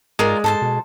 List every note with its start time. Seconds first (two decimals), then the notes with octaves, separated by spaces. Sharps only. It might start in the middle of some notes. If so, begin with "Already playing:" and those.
0.19 G#2 G#3 F4 A#4 D5
0.44 G#2 A4 C5 A5
0.62 B2